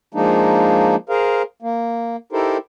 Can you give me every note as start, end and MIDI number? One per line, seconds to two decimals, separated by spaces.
0.14 0.96 53
0.14 0.96 56
0.14 0.96 58
0.14 0.96 62
0.14 0.96 63
1.09 1.42 68
1.09 1.42 70
1.09 1.42 72
1.09 1.42 77
1.62 2.16 58
2.32 2.57 63
2.32 2.57 64
2.32 2.57 67
2.32 2.57 69
2.32 2.57 70
2.32 2.57 72